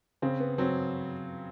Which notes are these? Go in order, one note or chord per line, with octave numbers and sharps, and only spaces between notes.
C#3 C4
B3
F#3 C4